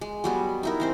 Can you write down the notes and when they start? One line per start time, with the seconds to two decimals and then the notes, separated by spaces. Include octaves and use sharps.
0.01 G#3
0.24 F#3 G3 B3
0.63 D#4 E4 A#4
0.80 E3 C4 C5